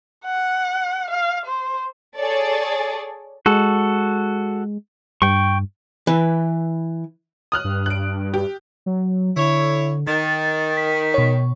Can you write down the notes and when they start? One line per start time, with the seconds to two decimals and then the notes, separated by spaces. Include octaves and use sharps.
0.25 F#5
1.10 F5
1.46 C5
2.18 G#4 A4 C#5 D5
3.46 G#3 F#4 A4
5.22 G2 G5 C#6
6.07 E3 B4
7.52 D#6 F6 F#6
7.65 G2
7.86 F#6 D7
8.34 G4
8.86 F#3
9.36 D3 E4 C#5
10.07 D#3 A6
10.77 B6
11.14 B2 C#5